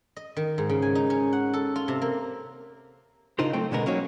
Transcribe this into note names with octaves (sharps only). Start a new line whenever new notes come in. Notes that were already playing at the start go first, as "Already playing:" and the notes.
D#5
D#3
G#2
C#3
G#5
D#4
C#4
F#5
A4
F4
C3
A#3
C#3 D4 D#4 F4 A#4 C5
F#3 A3 C4 G5
B2 D3 G#3 B3 A#4
F#3 A#3 C#4 D#4 F#4 C#5